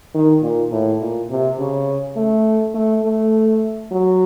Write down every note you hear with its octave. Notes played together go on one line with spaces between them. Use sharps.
D#3
A#2
A2
A#2
C3
C#3
A3
A3
A3
F#3